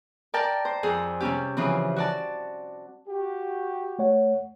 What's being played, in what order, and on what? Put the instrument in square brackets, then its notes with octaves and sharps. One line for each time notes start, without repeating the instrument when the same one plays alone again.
[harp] A#4 D5 G5 A5
C5
F2 G#4
C3 G3 C#4 G4
C#3 E3 F3 C4
F#4 D5 A5
[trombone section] F#4 G4
[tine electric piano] A3 C#5 F#5